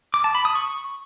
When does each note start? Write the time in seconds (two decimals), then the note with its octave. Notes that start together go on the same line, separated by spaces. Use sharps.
0.14 D6
0.24 A5
0.35 B5
0.45 D#6
0.55 C#6